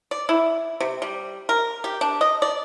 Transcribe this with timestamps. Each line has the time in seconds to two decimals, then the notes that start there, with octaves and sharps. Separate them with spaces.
0.11 D5
0.29 E4
0.80 C3
1.02 G3
1.49 A#4
1.84 G4
2.01 D4
2.21 D#5
2.42 D5